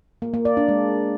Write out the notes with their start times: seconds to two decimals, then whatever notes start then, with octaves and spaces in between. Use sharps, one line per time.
0.22 A#3
0.34 A#3
0.45 D5
0.57 D4
0.69 G#3